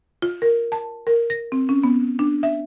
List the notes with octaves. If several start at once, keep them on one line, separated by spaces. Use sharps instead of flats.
F4
A#4
A5
A#4
A#6
C4
C#4
B3
D4
E5